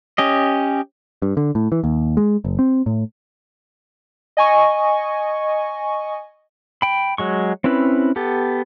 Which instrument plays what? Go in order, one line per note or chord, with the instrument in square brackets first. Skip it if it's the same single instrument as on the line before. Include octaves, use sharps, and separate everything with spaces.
[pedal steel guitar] C#4 G4 D#5
[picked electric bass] G2
D3
A2
E3
D#2
G#3
F#1
C4
A2
[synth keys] D#5 G#5 C#6
[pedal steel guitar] G5 B5
F#3 G#3 C#6
C4 C#4 E4 B4
B3 G4 A4